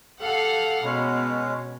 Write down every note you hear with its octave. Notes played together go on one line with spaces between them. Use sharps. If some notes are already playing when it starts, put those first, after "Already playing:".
G4 A4 F5 F#5
B2 G#3 C#4 C#5